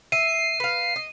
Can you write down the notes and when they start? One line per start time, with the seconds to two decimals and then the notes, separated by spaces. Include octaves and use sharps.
0.12 E5 C7 D#7
0.60 B4 F5
0.96 D#5